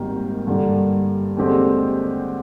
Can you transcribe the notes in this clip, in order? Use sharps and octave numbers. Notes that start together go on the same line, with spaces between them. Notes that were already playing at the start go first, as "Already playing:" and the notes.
Already playing: G#1 G#2 D#3 G3 A#3
G2 D3 G3 A#3
D#2 D3 G#3 C4 G4